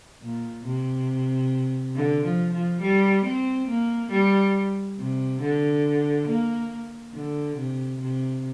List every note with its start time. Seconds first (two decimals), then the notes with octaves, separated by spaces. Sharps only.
0.22 A#2
0.65 C3
1.95 D3
2.24 F3
2.53 F3
2.81 G3
3.25 C4
3.68 A#3
4.11 G3
4.98 C3
5.41 D3
6.27 A#3
7.14 D3
7.57 C3
8.00 C3